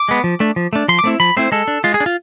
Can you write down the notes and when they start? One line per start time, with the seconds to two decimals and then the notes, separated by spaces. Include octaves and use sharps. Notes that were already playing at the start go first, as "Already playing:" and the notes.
Already playing: D6
0.09 G#3 B3
0.24 F3
0.40 A3 D4
0.56 F3
0.73 A3 D4
0.88 F3 C6
0.99 D6
1.04 A3 C4 E4
1.20 F3 B5
1.37 A3 C4 E4 C5
1.52 G#3 A4
1.68 D4
1.84 G#3 F4
1.94 G#4
2.00 D4
2.06 F4